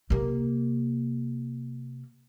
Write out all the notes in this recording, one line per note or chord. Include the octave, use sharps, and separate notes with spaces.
C3 A#3